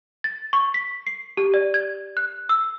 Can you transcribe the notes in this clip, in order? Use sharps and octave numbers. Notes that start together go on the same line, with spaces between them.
A6
C#6
B6
C7
G4
D5
G#6
F#6
E6